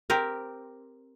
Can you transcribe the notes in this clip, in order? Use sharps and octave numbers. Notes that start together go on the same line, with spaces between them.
C4 G4 A#4